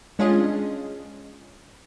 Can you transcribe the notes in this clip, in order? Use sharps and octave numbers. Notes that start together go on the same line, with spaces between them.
G#3 C#4 D4 F4 G#4 D#5